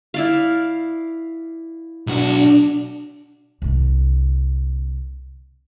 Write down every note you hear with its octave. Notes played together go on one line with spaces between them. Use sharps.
E4 D5 F5
B1 D4 F#4
C2 D3